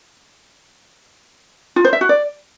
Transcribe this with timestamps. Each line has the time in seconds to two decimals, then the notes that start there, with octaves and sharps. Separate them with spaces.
1.76 F4
1.85 C5
1.93 E5
2.01 F#4
2.09 D5